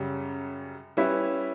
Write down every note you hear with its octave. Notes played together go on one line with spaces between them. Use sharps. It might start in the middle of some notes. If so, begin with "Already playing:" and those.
Already playing: F#2 C#3 G3
G3 C#4 E4 B4 E5